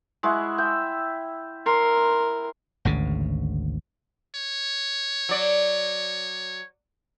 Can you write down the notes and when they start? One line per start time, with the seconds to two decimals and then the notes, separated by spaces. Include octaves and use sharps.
0.23 G#3 E4 F#4
0.58 E5 G5
1.66 A#4 C6
2.85 G#1 D2 C#3
4.35 C#5
5.29 F#3 D5